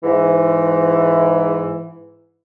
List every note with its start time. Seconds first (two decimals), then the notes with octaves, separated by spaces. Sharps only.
0.04 G#2 E3